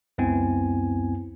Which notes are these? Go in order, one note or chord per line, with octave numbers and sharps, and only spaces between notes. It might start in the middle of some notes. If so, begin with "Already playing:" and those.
C#2 F#2 B3 C4 E4 G#5